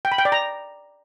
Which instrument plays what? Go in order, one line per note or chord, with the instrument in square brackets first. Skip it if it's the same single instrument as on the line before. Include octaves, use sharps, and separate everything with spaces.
[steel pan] G5
B5
G5
D5
A#5